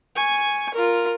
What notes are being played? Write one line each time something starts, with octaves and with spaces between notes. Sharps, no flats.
G#5 C#6
F4 A#4